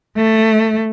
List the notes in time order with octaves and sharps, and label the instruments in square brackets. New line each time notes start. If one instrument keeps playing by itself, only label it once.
[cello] A3